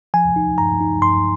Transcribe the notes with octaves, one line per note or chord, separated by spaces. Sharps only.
F3 G#5
D#4
G2 A#5
D#4
G2 C6